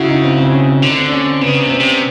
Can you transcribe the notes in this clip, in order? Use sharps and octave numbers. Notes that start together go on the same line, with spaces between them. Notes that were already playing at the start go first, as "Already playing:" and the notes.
Already playing: C#3 E4 F#4
D#4
C4
C4
C#4
C4
D3 C#4
C4
D4
C#4
C4
C#3 B3
C3
B3
C4
C3